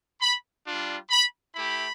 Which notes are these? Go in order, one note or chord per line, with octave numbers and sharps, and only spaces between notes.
B5
G3 D4 F4
B5
A3 E4 G4 B5